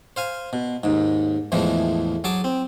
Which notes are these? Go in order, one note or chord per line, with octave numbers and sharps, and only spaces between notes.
C5 F5 G#5
B2
D#2 G#2
E2 A2 E3 F3 G#3
F#3 G#4 A5 D6
C4